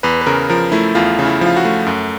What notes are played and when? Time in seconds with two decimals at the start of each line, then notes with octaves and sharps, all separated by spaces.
0.03 E2 B4
0.21 B4
0.26 C#3 A#4
0.50 F3 A#4
0.72 A3 E4
0.95 E2 F4
1.19 C#3
1.25 E4
1.41 F3
1.46 F4
1.56 F#4
1.65 A3
1.86 F#2